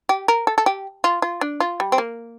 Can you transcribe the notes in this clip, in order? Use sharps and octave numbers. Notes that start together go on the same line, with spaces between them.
G4
A#4
A4
A4
G4
F4
F4
D4
F4
G3
C4
A#3